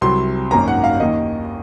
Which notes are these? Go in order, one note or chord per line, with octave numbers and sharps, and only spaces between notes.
C2 C3 F#3 C6
G#1 F#2 D#3 A#3 C#4 A#5
F#5
F5
D#2 D#3 A#3 D#5